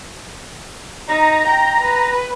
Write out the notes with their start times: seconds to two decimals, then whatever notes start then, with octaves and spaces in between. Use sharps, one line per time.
1.08 D#4 A#5
1.48 G5
1.81 B4